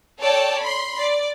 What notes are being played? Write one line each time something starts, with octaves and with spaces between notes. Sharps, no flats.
A4 C#5 D5 G5 A5
B5 C6
D5